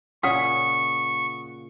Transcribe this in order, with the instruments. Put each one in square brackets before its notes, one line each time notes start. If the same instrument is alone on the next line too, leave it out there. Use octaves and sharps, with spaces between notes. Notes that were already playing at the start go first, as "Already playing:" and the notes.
[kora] A#2 C#3 [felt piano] F#5 D#6 B6 [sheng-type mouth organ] C#6